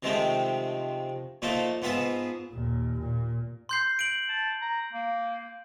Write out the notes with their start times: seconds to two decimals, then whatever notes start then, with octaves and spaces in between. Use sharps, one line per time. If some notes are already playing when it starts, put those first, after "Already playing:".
0.03 C3 D#3 F3 G#3 A3 C4
1.42 A#2 F3 A3 D#4 F4 A4
1.82 G#2 B3 F4 G#4 E5 A5
2.52 D#2 A#2
3.00 A#2
3.69 C6 G6 C7
3.99 D7 F#7
4.29 A5
4.61 A#5
4.93 A#3